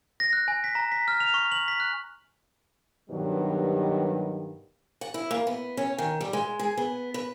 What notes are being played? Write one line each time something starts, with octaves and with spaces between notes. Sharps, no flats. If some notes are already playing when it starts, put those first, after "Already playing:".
A#6
F#6
G#5
B6
A#5
B6
F6
F7
C#6
F#7
B6
F#6
G2 B2 D#3 F#3 G3
F#5
E4
A#3
B3
C#4
D#3
G3
G#3
G#4
B3
B4